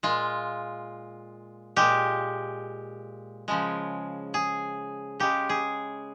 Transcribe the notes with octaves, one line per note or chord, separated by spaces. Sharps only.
A#2 G#3 F4
A#2 G#3 G4
C#3 F3 G#3
G#4
C#3 G#3 G4
G#4